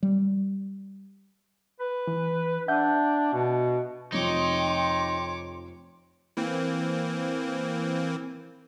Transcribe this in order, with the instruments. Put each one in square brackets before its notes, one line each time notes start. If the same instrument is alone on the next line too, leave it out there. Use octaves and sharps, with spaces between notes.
[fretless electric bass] G3
[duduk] B4
[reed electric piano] E3
[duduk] D4 [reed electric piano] E5 F#5 G6
[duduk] B2
[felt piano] F1 F2 [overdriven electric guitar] D#4 [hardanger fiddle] C#5 D6 [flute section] G5 C6
[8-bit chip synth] E3 A#3 C4